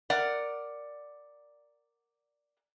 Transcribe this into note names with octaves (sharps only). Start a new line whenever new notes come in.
A#4 D5 F#5